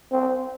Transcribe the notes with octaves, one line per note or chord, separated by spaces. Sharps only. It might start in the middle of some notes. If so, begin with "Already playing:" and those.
C4